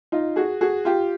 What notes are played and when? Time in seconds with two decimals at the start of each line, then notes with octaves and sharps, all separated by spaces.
0.12 D#4 F4
0.36 F#4 G#4
0.61 F#4 G#4
0.85 F4 G4